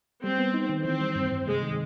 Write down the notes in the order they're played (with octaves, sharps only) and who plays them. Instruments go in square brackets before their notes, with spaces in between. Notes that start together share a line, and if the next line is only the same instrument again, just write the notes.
[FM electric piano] G3 [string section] C4
[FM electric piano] B3
D#4
D#3
[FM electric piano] E3 [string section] C4
[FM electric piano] G3
G2
G2
[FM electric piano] C3 [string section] G#3
[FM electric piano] D#3